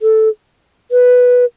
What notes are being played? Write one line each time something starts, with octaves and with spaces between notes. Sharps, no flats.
A4
B4